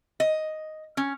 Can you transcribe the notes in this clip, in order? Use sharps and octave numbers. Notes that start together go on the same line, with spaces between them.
D#5
C#4